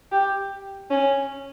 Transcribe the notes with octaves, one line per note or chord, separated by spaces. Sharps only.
G4
C#4